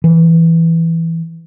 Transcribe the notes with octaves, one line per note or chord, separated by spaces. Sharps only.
E3